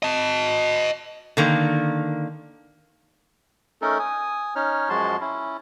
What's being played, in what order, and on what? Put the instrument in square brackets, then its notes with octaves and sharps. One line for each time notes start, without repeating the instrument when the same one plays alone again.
[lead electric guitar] D#5 A5
[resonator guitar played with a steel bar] D3 D#3 A#3
[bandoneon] A3 C#4 D#4 A4 A#4
G#5 D#6
C#4 D#4 C#5 F6
F#2 F3 G#3 F#4 A5 C6
C#4 E4